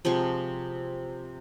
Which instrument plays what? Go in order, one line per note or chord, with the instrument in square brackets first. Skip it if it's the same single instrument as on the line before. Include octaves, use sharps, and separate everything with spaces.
[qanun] C3 F3 G#3 C#6